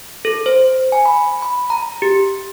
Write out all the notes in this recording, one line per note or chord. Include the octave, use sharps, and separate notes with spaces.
A4
C5
G#5
B5
B5
A#5
G4